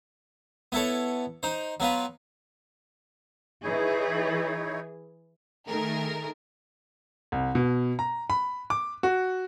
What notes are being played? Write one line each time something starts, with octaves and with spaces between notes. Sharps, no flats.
B3 E4 A4 C#5
D#4 C5
F#3 B3 F4 B4
E3 D#4 E4 G#4 C#5
D#3 A3 G#4 A#4
C2
B2
A#5
B5
D6
F#4